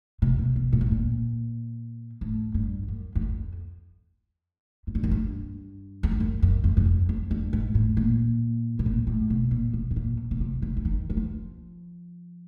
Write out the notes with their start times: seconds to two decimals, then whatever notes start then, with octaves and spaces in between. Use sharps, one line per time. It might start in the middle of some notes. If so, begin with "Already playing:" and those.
0.22 C3
0.39 B2
0.56 B2
0.73 A#2
0.81 A2
0.91 A#2
2.21 A2
2.54 G2
2.83 G2
2.88 F#2
3.15 F#2
3.21 F2
4.87 G#2
4.95 G2
5.03 F#2
5.11 G2
6.03 E2
6.12 F2
6.20 F#2
6.42 F#2
6.64 F2
6.77 F#2
6.86 F2
7.09 F2
7.31 G2
7.53 G#2
7.75 A2
7.97 A#2
8.79 B2
8.86 A#2
9.07 A2
9.30 B2
9.51 A#2
9.74 B2
9.91 A2
9.96 A#2
10.31 B2
10.40 C3
10.62 C#3
10.77 E3
10.85 D#3
11.10 E3
11.17 F3